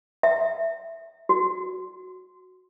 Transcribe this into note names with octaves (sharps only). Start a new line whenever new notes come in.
E5
F#4